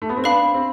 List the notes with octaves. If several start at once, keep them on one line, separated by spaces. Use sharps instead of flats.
A3
B3
C4
D4 B4 F5 B5
C4